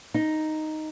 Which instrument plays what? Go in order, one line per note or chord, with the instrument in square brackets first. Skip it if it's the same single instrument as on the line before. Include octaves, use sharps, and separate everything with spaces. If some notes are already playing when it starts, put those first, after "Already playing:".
[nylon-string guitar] D#4